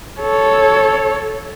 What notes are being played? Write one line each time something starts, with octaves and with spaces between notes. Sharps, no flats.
A4 C#5